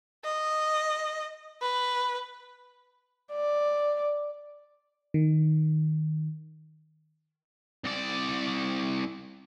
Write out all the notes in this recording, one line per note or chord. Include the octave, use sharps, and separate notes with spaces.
D#5
B4
D5
D#3
C2 D5